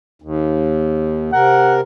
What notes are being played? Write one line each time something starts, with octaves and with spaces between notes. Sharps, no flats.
D#2
C3 A#4 F#5